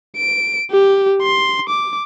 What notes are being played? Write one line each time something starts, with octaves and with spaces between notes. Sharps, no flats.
D7
G4
C6
D6